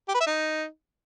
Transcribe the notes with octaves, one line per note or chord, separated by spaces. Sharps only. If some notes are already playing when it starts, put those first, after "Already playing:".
G4
B4
E5
D#4